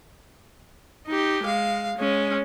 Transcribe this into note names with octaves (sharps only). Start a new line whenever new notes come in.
D#4 G4
G#3 F5
G#3 C#4